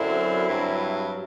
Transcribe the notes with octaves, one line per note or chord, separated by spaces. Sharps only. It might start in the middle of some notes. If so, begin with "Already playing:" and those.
Already playing: F#2 D3 F#3 C4 E4
G2 F#3